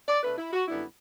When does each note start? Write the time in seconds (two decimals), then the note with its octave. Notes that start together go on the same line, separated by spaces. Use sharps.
0.09 D5
0.23 B2 A3 D4 B4
0.38 E4
0.53 F#4
0.68 F#2 D3 G3 B3 D4 E4